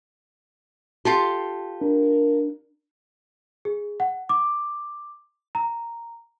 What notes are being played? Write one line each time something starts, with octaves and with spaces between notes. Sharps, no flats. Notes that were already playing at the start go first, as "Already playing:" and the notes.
F4 G4 A4 C6
D4 A#4
G#4
F#5
D6
A#5